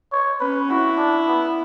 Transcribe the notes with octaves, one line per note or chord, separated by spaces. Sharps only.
C#5
C#4 B4
E4 F#4
D4
B3